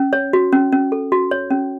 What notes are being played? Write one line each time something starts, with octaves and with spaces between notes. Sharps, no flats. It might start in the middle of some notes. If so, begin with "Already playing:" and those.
Already playing: C#4
C#5
F#4
C#4
C#4
A4
F#4
C#5
C#4